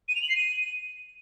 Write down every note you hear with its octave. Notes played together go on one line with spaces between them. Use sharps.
D#7
F7
F#7
C7
D#7